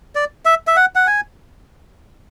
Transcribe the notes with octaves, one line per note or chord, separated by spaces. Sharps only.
D5
E5
E5
F#5
F#5
G#5